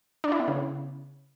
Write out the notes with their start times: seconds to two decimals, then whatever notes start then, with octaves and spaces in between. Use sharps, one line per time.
0.24 D4
0.32 E4
0.40 B3
0.48 C#3